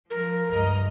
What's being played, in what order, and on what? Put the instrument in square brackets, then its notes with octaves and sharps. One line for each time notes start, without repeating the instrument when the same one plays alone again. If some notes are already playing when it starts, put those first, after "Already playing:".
[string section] F3 [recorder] A#4
[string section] C#2 G2 D#5 [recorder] A#5